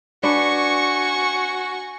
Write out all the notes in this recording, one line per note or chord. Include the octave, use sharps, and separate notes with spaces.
D4 F#4 B4 G#5 C#6